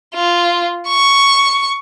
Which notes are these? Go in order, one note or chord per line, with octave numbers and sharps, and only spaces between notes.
F4
C#6